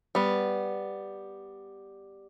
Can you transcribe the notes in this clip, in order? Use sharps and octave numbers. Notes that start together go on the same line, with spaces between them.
G3 B3